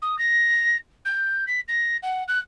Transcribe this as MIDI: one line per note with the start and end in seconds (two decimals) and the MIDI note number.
0.02 0.17 87
0.18 0.76 94
1.05 1.44 91
1.47 1.60 95
1.68 1.97 94
2.03 2.23 78
2.28 2.39 90